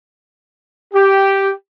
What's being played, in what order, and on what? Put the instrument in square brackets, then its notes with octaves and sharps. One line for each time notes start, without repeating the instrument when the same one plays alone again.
[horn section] G4